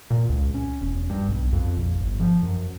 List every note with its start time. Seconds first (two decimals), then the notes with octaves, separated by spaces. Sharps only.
0.10 A#2
0.29 C#2
0.54 C#4
0.81 E1
1.10 G2
1.28 B1
1.53 F2
1.76 A#1
2.00 G1
2.20 F3
2.42 F#2